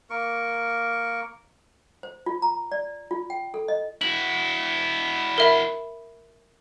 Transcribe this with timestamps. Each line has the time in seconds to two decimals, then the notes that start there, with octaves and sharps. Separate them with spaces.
0.10 A#3 A#4 C#6
2.03 C5
2.26 F4
2.42 A#5
2.72 D5
3.11 F4
3.30 G5
3.54 A4
3.68 D#5
4.01 E4 F#4 F#7
5.38 A#4 E5 B5